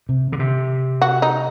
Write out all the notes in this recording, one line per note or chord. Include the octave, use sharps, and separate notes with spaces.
C3
D3
C3
F#4
D#4